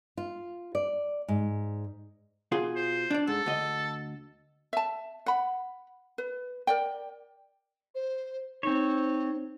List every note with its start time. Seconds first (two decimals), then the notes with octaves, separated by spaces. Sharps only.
0.17 F4
0.75 D5
1.28 G#2
2.52 B2 F4 G#4
2.76 C5
3.11 D4 D5
3.27 G#2 A4
3.46 D2 D#5
4.73 E5 A5
5.26 F#5 B5
6.18 B4
6.67 A#4 D5 G5
7.95 C5
8.63 C4 D#4 C#5